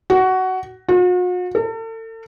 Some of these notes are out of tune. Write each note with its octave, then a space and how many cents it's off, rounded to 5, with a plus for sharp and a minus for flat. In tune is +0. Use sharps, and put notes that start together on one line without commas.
F#4 +15
F#4 -45
A4 +40